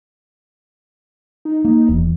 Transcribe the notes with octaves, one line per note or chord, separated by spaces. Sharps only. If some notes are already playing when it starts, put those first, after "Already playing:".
D#4
A#3 D#4
D#1 E2